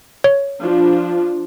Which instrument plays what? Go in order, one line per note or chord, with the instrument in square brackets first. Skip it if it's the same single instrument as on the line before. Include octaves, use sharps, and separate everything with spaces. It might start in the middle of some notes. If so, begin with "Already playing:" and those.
[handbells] C#5
[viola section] F3 D4 F4